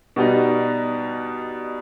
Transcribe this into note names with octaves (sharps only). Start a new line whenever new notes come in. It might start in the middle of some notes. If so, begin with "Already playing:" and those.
B2 G3 B3 D#4